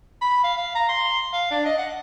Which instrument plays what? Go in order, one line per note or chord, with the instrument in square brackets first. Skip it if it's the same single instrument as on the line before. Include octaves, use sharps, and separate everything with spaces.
[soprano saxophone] B5
F5
F5
A#5
C6
F5
D4
D#5
F#5